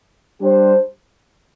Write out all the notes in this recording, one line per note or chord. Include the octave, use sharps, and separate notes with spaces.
G3 D4 G4 C5